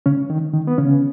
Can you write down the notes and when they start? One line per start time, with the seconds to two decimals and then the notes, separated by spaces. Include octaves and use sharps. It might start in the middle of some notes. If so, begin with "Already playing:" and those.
0.06 C#3 C#4
0.30 D#3
0.54 D#3
0.67 B3
0.78 C#3 C#4